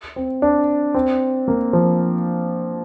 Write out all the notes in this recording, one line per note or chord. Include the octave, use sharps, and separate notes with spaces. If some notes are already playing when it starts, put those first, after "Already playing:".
C4
D4
C4
A#3
F3